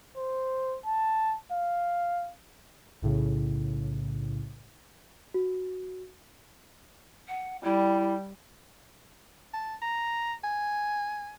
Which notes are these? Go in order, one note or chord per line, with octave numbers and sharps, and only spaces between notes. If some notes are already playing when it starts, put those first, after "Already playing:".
C5
A5
F5
B1 A2 C#3
F#4
F#5
G3 E4
A5
A#5
G#5